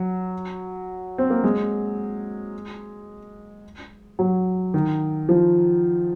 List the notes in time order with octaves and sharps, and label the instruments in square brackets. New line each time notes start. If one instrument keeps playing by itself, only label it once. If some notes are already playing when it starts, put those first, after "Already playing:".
Already playing: [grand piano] F#3
C4
A#3
G#3
F#3
D#3
F3